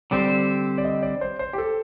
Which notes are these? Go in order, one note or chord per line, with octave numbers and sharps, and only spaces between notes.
D3 G3 C4 G4 C5 D5
D5
D#5
D5
C5
C5
G4
A4